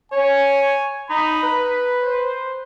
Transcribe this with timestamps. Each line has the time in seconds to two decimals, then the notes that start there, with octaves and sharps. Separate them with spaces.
0.12 C#5 G#5
1.10 D#4 B5
1.43 B4
2.03 C5